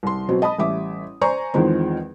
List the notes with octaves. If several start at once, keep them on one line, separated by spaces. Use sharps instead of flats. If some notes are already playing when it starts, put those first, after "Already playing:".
C2 C6
B2 F#3 C4
D#5 A5 B5 D#6
A1 G3 E5 D6
C5 D5 G#5 A#5 C#6
E2 D#3 F3 G#3 C4